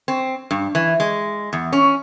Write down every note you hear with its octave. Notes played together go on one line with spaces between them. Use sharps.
C4
G2
E3
G#3
E2
C#4